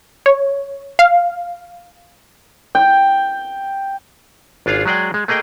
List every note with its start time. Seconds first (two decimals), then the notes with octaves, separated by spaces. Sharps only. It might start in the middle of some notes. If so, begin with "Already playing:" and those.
0.26 C#5
0.99 F5
2.75 G5
4.66 G#1 D4 F4 G#4 F5
4.85 F#3 G#3 G#4 D5 G5
5.14 G#3
5.28 A3 A#3 G#4 D#5 G5